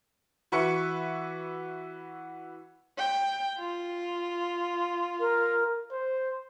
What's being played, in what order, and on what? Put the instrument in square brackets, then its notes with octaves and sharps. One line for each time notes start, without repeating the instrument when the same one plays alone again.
[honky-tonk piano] E3 F#4 B4 E5 C#6 C#7
[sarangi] G5
F4
[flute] A#4
[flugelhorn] C5